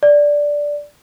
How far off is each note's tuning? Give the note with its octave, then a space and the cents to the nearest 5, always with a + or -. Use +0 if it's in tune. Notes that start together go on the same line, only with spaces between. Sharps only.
D5 -5